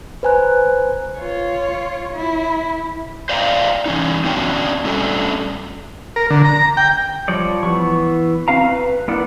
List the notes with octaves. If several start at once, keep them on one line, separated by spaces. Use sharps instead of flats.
B4 C5 G#5 A#5 F#6
F4 C#5
E4
C5 D5 F5 G5 A5 A#5
E3 C#4 D#4
B3 C#4 D4 F#4 D5 G5
G3 A3 C#4 D4 A4
A#4
D3
A#5
G5
F3 G3 C#5 D5
E3 B3 C#6
C4 F#4 F5 A#5
B4
A#3 B3 E4 D5 F#5